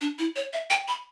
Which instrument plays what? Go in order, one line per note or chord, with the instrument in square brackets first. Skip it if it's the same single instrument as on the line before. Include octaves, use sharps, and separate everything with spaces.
[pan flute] D4
E4
C#5
E5
G5
B5